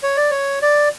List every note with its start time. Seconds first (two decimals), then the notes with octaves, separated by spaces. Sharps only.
0.03 C#5
0.17 D5
0.31 C#5
0.62 D5